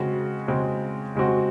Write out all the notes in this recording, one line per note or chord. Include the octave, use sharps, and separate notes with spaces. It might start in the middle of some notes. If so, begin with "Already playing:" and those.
Already playing: C#3 G#3 C4 F#4
C#3 G#3 C4 F#4
C#3 G#3 C4 F#4